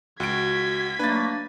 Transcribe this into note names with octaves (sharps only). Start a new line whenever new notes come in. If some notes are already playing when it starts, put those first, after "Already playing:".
C#2 F#4 G#6 B6 D7
F#3 A3 A#3 D4 B4 A6